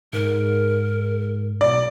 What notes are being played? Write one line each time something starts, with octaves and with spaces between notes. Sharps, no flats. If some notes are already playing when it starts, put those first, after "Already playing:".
G#2 A#4
B1 D5